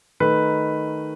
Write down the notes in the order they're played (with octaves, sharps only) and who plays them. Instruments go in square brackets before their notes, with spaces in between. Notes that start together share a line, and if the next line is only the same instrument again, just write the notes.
[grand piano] D#3 A3 D#4 B4